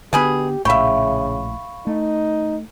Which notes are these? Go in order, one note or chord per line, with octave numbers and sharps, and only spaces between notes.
B2 D3 B3 G4 G#4 B5
A#1 A2 C#3 E5 F5 G5 B5 C#6
A3 D#4